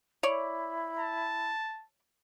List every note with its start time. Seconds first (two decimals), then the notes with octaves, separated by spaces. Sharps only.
0.23 E4 C#5 D5
0.99 A5